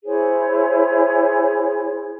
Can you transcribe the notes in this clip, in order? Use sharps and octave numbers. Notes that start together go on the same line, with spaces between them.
E4 G#4 C5 C#5